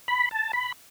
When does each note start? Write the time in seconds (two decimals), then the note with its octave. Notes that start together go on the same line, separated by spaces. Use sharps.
0.08 B5
0.31 A5
0.53 B5